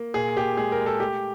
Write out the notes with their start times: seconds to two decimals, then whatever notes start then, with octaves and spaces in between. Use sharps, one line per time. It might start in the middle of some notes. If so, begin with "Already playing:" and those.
Already playing: A#3
0.14 A#2 G#4
0.36 A#2 G4
0.57 G#3 G#4
0.72 A#4
0.79 G#3
0.86 A4
1.00 A3 G4